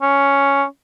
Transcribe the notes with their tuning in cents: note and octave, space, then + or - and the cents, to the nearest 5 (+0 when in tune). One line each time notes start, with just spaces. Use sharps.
C#4 +5